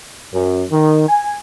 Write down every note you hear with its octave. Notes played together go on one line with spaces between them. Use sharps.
F#2
D#3
G#5